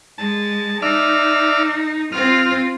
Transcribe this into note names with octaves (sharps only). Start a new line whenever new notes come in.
G#3 A5
D#4 D5 E5 F6
C4 F4 F6